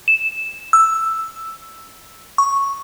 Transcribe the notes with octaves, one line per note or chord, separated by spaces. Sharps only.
E7
E6
C#6